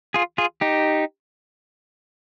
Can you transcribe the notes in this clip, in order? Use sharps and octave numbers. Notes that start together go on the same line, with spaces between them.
F4 G#4
F4 G#4
D#4 G4